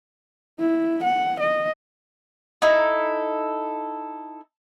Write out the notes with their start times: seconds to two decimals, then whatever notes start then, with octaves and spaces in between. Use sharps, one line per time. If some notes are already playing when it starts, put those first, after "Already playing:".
0.59 E4
1.04 F#5
1.40 D#5
2.62 D#4 E4 A4